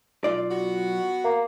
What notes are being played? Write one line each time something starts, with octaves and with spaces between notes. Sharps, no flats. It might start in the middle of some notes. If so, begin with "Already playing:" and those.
B1 F4 D5
B3 F#4
A#3